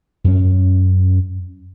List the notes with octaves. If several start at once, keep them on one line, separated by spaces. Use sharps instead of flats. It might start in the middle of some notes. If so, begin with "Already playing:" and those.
F#2 C#4